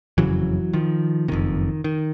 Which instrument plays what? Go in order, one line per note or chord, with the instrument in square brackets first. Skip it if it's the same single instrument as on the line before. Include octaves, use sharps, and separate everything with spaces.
[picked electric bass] F#1 F2 C#3 E3 F#3
D#3 F3
F#1 F2 C3 D#3
D#3